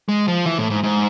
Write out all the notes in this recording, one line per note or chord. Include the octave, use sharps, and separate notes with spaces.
G#3
F3
E3
A2
G#2
G#2